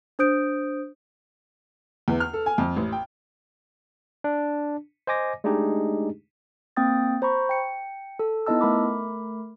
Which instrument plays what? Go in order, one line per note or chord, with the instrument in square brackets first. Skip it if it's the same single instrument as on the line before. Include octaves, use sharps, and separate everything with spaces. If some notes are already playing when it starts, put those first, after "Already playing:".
[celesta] D4 C5 D#6 G6 D7
[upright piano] E2
F6
A4
G#5
F2
A1
G5
[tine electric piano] D4
C5 D#5 G#5 D6 A#6
G#3 A3 D4 D#4 G4 G#4
[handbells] A#3 C4 G5 D#6 A6
C5 A#5 B5 C#6
G5 C#7
A4
B3 D#4 E4 D#5 A5 E6
A3 A#4 B5 D6